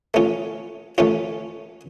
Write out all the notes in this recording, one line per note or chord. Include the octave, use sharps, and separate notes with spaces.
A3 C#4 F4
A3 C#4 F4